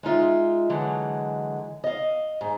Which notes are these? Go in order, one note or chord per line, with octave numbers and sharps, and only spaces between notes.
G#3 D#4 F4 E5
D3 E3 F#3 G#3
D#5 F5
G#2